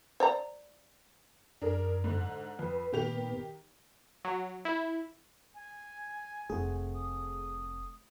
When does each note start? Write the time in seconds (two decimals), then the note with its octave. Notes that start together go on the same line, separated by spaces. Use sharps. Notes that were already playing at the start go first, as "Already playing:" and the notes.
0.20 C5 D5 A#5
1.62 F#2 D4 G#4 A#4
2.04 G#2 D3
2.59 F2 B4
2.92 A#2 D#3 B3 G4 F7
4.25 F#3
4.65 E4
5.55 G#5
6.50 F1 A3 C4 G#4 F#5
6.95 D#6